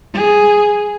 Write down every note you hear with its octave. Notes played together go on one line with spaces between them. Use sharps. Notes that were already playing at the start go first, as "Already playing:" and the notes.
G#4